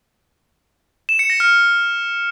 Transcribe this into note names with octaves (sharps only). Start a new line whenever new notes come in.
E7
C#7
A#6
F6